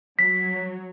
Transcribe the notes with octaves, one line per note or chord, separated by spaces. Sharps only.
F#3 B6